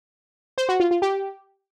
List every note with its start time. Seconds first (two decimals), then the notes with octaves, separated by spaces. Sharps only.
0.58 C5
0.69 F#4
0.80 F4
0.91 F4
1.02 G4